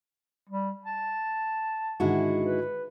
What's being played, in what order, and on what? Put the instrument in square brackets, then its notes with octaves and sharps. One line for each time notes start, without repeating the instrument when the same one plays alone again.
[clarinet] G3
A5
[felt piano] G#2 D3 D#3 [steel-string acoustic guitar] G#3 E4 F#4
[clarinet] B4